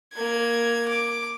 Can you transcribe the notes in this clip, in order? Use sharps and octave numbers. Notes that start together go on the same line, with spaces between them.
A#3 G#6
D6